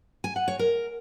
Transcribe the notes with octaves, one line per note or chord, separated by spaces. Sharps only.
G#5
F#5
C#5
A#4